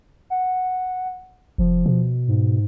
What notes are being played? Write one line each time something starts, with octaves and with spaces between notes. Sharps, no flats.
F#5
F1 F3
B2
G#2